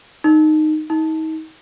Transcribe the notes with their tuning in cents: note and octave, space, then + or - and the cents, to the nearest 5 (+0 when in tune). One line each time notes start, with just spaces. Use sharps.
D#4 -10
D#4 +35